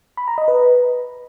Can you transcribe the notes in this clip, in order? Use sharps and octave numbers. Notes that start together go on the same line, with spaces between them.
B5
A#5
D#5
B4